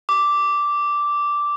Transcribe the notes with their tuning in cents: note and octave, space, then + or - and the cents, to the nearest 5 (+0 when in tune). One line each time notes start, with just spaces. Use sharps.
D6 -5